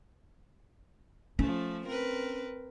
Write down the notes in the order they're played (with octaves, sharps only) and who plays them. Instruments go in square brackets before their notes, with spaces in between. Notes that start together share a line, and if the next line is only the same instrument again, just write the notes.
[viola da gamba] F3 A3 [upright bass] C#4
[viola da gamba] C4 A#4 B4